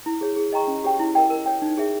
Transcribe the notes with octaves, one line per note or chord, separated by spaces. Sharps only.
E4
G#4 C#5
G#4
D#5 G5 A#5 C#6
C#4
G4 C#5 G5
E4
A#4 D#5 G5
A#4
C#5 G5
D#4
G#4 C#5 E5